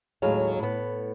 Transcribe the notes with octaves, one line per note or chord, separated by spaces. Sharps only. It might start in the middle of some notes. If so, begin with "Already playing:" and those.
D#2 A2 F#3 G#3 F5
A2 B3